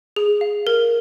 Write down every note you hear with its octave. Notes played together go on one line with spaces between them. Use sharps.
G#4
F5
A#4